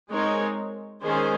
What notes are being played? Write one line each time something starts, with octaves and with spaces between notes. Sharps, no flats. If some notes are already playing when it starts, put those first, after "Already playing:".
G#3 C4 D#4 A#4 C#5
D#3 G#3 C#4 G#4 C5